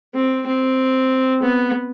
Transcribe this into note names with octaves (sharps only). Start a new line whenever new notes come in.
C4
C4
B3